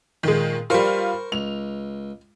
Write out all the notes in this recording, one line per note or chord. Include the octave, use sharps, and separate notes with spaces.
A#2 D#3 G#3
G3 F4 A#4 C5 C#6
C#2 F7